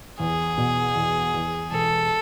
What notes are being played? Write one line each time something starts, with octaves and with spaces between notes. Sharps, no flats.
E2 G#4
B2
E2
E2
E1 A4